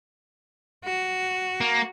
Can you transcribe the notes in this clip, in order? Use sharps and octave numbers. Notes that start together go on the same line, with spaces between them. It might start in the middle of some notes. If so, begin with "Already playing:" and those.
F#4
A#3